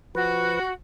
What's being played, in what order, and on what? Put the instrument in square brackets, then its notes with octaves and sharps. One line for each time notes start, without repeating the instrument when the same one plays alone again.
[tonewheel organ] F3 B4 [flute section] F#4